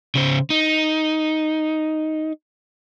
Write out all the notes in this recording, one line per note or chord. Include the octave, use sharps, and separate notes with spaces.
C#3 C5
D#4